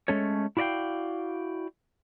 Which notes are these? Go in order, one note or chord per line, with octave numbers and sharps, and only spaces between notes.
G#3 A3 C#4 A4 C#5
E4 F#4 D5 D#5 F5 G5